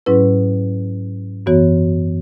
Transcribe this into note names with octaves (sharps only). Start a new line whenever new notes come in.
G#2 F#3 C#4 E4 B4
F#2 E3 B3 F#4 C#5